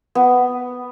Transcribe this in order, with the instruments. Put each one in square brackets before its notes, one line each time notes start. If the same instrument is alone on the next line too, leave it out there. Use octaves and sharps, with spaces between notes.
[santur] B3